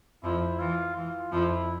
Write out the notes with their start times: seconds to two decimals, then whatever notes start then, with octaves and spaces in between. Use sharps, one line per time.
0.23 F2 F3 E4
0.59 E3 F4
0.96 E3 F4
1.32 F2 F3 E4